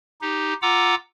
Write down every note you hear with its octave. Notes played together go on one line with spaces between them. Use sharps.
D#4 G4
F4 F#5 A#5 D6 E6